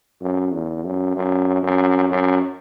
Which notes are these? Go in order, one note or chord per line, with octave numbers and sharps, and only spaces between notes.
F#2
E2
F#2
F#2
F#2
F#2